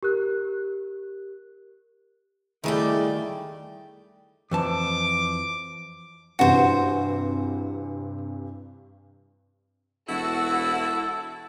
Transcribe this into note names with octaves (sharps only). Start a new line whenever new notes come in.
G4 A#4 F#6
D#3 G3 A3 E4 G#4 D5 E5 G5
F2 E3 A5 D6
G2 C3 E3 F#4 C5
E1 E4 F#4 A4